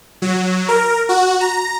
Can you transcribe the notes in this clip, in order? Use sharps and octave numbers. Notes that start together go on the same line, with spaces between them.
F#3
A#4
F#4
A#5